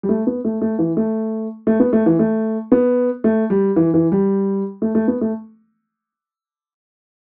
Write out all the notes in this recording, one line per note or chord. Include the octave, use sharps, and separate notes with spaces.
G3
A3
B3
A3
A3
E3
A3
A3
B3
A3
E3
A3
B3
A3
G3
E3
E3
G3
A3
A3
B3
A3